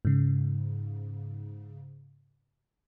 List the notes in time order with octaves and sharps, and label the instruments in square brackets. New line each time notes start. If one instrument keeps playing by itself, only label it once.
[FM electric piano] G#2 C#3